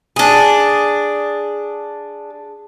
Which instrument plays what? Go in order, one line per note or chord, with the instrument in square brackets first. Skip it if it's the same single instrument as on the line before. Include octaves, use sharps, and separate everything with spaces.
[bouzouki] D4 G#4